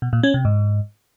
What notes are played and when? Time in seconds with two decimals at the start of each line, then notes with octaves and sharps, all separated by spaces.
0.02 B2
0.13 A#2
0.23 C#4
0.34 C3
0.45 G#2